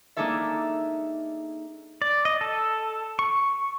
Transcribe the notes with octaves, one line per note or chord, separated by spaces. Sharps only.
A#3 D4 D#4 G#4 A4 E5
D5
D#5
A4
C#6